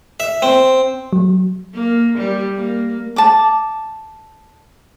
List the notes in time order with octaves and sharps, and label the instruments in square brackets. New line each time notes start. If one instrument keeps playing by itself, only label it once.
[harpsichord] E5
C4
[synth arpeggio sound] F#3
[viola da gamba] A#3
G3
A#3
[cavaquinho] A5 D6